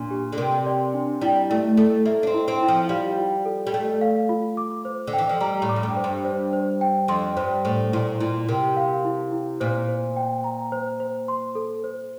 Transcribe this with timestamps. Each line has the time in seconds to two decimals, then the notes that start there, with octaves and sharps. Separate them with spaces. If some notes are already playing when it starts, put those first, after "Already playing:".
Already playing: A#2 D4
0.11 G4
0.32 D3
0.38 C3 A#4
0.66 D5
0.94 D4
1.21 G3 E4
1.50 A3 E4
1.77 A3 A4
2.05 A#3 E5
2.23 D4
2.27 C4
2.34 E4
2.48 C4
2.62 E4
2.68 F3
2.89 G3 F5
3.18 F4
3.45 A4
3.67 G3
3.74 A3 D5
4.01 F5
4.29 F4
4.57 D6
4.85 C5
5.07 D3
5.13 G5
5.18 E3
5.29 F3
5.41 G3 A#5
5.62 A2
5.69 D6
5.76 F2
5.83 G2
5.97 C5
6.04 G2
6.25 C5
6.53 C5
6.81 G5
7.08 F2 C6
7.37 G2 C5
7.64 A2 C5
7.93 A#2 E4
8.20 A#2 E4
8.49 C3 A#4
8.77 F5
9.05 E4
9.32 E4
9.60 A#2 C5
9.88 C5
10.16 G5
10.44 A#5
10.72 C5
11.00 C5
11.28 C6
11.55 A4
11.84 C5